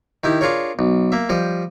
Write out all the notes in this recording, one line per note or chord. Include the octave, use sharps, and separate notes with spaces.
D#3 E4 G4
D4 F4 G#4 A#4 C#5
B1
A#3 E5
F3 G3 D#5